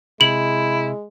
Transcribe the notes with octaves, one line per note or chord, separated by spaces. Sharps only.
C3 G#3 E4 F#7